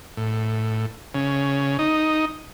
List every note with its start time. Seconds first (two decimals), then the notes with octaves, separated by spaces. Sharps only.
0.17 A2
1.15 C#3
1.79 D#4